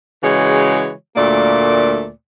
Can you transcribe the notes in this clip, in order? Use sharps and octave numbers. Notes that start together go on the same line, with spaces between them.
C#3 E3 G#3 F#4 C#5
D2 A#2 A3 A#3 D5